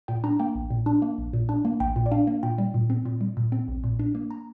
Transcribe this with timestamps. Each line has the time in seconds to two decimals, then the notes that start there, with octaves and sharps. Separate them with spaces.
0.08 A#2 G5
0.24 D4 A#5
0.40 A#3 G5
0.55 A#1
0.70 A#2
0.86 D4
1.02 A#3
1.18 A#1
1.33 A#2
1.49 D4
1.65 A#3
1.80 A#1 G5
1.96 A#2
2.06 D5
2.12 D4 F5
2.27 A#3
2.43 A#2 G5
2.58 G3
2.74 A#2
2.90 C4
3.05 A#2
3.21 G3
3.37 A#2
3.52 C4
3.68 A#1
3.84 A#2
3.99 D4
4.15 A#3
4.31 A#5